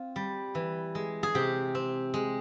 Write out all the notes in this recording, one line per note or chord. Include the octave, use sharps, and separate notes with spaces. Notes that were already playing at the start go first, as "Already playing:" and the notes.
Already playing: C4 F4
G3
E3
G#3
G#4
C3 G4
C4
G#3